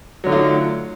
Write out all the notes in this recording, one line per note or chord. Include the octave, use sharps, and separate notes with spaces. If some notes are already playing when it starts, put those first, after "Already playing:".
D3 F#3 A3 D#4 F4